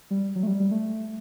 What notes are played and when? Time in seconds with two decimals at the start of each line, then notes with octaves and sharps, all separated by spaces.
0.11 G3
0.36 F#3
0.43 A3
0.47 G3
0.60 G3
0.71 A3